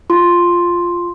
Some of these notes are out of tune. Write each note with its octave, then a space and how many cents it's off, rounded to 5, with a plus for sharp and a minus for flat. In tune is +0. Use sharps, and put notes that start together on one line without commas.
F4 +0 C6 +0